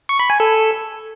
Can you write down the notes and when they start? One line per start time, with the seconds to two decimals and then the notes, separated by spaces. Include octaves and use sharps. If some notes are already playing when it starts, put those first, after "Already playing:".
0.09 C#6
0.19 B5
0.30 G#5
0.40 A4